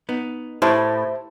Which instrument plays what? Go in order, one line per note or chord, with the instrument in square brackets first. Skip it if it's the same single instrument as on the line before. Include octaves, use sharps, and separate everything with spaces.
[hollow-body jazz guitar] B3 D#4
[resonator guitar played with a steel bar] A2 [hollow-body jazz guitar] E4 G4 B4 [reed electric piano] C5 E5